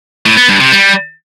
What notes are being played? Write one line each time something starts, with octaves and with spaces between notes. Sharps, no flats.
A2
B3
G2
C3
G3